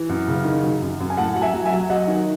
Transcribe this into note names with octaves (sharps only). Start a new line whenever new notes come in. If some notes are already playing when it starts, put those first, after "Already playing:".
Already playing: E3
F#2
C#3
D#3
F#3
F#2
F#2
G#5
A2 F#5 A5
F#3 F#5
E5 G#5
F#3
E5 G#5
F#3
F#3 D#5 F#5
D#3